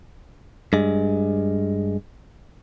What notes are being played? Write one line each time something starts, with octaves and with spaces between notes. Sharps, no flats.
G2 G#3